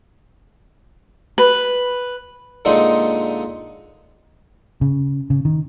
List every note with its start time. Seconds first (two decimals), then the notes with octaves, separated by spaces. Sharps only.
1.38 B4
2.65 A#2 D3 G#3 C4 D#4
4.81 C#3
5.30 C#3
5.45 D#3